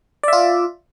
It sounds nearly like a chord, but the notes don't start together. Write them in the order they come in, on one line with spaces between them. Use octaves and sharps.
D5 E5 F4